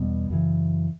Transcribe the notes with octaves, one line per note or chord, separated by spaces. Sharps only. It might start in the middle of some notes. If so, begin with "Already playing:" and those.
Already playing: E2 B2 G3 B3
F#2 C#3 E3